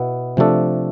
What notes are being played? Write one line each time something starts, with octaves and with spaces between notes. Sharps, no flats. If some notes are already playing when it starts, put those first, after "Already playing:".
Already playing: B2 B3 E4
C3 F3 A3 D4 A4